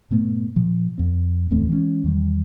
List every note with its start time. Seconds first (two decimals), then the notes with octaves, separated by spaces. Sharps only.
0.11 G2 A#2 A3 B3
0.56 A#2 F3
0.98 F2 C4
1.51 D1 E2 A3 C4
1.69 E3 G#3 A#3 C#4
2.04 E2 D#3 G3